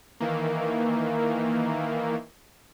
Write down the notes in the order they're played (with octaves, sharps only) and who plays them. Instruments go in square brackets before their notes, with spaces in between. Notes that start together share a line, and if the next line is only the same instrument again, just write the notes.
[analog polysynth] D#3 E3 A#3